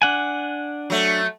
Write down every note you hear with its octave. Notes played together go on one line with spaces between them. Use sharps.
D4 F#5 G#5
F#3 A3